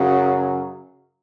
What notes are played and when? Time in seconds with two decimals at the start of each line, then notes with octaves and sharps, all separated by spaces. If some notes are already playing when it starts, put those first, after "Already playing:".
Already playing: F#2 C#3 F#3